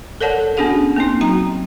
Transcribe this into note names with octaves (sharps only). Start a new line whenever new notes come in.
A4 A#4 C#5 D5 F#5 A5
B3 C#4 D4 F#4 G#4 F#5
A#3 C4 D#4
F#3 F#4 G5 A#5